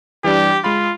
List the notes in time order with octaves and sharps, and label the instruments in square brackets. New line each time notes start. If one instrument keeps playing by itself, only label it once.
[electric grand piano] E3 G3 D4 [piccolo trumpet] G4
[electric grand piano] G#3 B5 [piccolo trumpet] F4